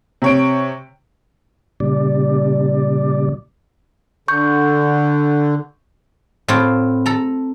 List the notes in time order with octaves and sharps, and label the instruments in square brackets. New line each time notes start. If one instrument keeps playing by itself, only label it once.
[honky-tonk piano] C3 C#5 D7
[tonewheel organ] A#2 C#3 G3 D5
[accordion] D3 [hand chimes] C#6 G6
[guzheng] A2 C4 F4
A4 A#5